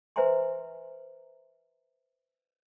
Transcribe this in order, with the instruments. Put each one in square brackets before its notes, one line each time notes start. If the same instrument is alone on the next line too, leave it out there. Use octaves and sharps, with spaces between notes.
[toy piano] B4 C5 E5 G#5 A#5 C6